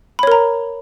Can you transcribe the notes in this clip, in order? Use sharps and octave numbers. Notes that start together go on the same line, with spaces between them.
A#4 C#5 A#5 B5